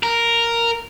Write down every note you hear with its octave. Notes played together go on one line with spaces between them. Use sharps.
A#4